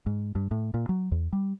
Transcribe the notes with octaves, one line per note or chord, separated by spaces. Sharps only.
G#2
G2
A2
A#2
F#3
E2
G3